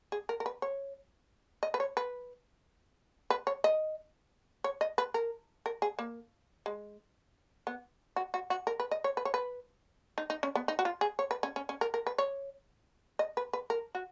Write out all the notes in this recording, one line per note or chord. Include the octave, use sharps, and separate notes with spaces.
G#4
A#4
A#4
B4
C#5
D#5
B4
C#5
B4
B4
C#5
D#5
C#5
D#5
B4
A#4
A#4
G#4
A#3
G#3
B3
F#4
F#4
F#4
A#4
B4
D#5
C#5
B4
C#5
B4
D#4
D#4
C#4
B3
D#4
F#4
F4
G#4
C#5
B4
C#4
C#4
C#4
A#4
A#4
B4
C#5
D#5
B4
B4
A#4
F#4